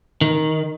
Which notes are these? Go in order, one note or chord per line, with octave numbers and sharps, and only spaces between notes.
D#3